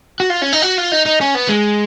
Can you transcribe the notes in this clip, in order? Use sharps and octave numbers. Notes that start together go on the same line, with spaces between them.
F#4
F4
C#4
D#4
F#4
F4
D#4
D#4
C#4
B3
G#3